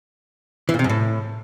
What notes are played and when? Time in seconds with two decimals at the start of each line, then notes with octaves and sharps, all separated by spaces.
0.69 E3
0.74 A#2
0.79 C3
0.84 F#2
0.89 A2